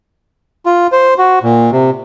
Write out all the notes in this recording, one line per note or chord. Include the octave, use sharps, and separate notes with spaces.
F4
C5
F#4
A#2
C3